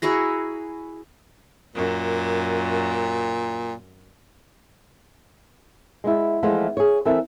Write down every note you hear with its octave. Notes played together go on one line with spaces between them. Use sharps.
E4 F#4 G#4 A#5
F#2 A#2
G#3 B3 E4
E3 F3 G#3 A3 B3 F4
G#4 C#5
E3 C4 A4 A#4 E5